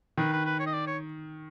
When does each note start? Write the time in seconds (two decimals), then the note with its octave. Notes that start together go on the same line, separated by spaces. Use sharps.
0.17 D#3 B4
0.32 B4
0.46 B4
0.59 C#5
0.66 D#5
0.73 D5
0.87 C#5